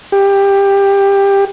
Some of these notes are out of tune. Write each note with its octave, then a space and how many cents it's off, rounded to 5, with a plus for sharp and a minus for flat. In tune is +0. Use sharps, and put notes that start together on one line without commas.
G4 +15